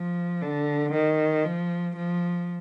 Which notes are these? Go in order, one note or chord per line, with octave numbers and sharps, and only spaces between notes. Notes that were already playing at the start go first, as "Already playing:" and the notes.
Already playing: F3
D3
D#3
F3
F3